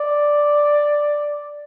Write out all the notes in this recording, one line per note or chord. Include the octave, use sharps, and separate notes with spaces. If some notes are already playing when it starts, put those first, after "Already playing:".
Already playing: D5